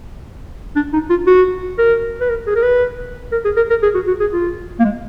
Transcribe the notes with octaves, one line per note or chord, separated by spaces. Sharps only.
D4
D#4
F4
F#4
A#4
B4
A#4
G#4
A#4
B4
A#4
G#4
A#4
A#4
G#4
F#4
F#4
G#4
F4
A#3
G#3